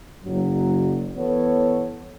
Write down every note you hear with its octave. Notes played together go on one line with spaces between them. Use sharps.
F#1 F#2 F#3
E3 B3 A4 C#5